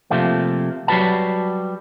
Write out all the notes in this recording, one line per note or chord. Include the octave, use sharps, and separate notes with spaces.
C3 F3 A3 A#3
F#3 G3 F#4 B4 A5